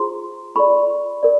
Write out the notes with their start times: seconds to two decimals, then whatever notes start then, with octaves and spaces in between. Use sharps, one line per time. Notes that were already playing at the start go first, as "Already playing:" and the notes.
Already playing: F4 G#4 C5 A#5 C6
0.55 F4 A4 D5 B5 C#6
1.23 A#4 D5